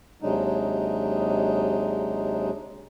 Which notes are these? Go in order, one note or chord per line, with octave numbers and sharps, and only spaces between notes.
D#2 C3 F#3 G#3 D4 D#4